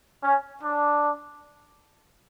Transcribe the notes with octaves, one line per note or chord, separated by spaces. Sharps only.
C#4
D4